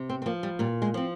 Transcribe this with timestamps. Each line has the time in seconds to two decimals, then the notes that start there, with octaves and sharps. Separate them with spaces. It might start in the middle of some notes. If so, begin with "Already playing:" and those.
Already playing: C3
0.09 C4
0.22 C4
0.26 F3 A#3
0.43 G3
0.59 A#2 G3
0.82 G#3
0.94 F3 C4